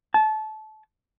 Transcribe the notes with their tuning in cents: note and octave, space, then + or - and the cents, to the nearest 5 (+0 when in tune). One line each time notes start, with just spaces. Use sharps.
A5 -25